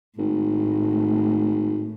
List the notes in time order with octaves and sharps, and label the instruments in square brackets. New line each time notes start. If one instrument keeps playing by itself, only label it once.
[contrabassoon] G#1 [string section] A2